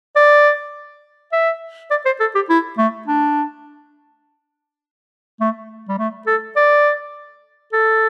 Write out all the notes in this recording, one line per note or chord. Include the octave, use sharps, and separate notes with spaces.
D5
E5
D5
C5
A4
G4
E4
A3
D4
A3
G3
A3
A4
D5
A4